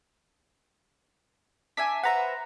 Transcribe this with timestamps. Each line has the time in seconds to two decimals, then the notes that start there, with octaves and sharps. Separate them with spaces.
1.77 D4 E5 G#5 B6
2.03 B4 C5 E5 F#5 A#5